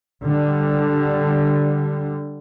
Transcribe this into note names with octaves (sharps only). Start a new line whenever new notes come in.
D3 G3